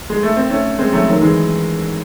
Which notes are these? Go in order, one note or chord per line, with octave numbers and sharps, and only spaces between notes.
G#3
A3
C4
A3 C#4
G#3 C4
F#3 A3
D#3 F#3
E3 G#3